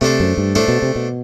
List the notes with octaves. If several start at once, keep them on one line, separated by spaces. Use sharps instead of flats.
C3 A3 D4 A4 C5
F#2
G2
A2 A3 D4 A4 C5
B2
C3
B2